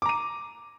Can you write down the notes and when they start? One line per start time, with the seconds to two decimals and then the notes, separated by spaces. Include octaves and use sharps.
0.02 D6
0.06 A#5
0.09 D#7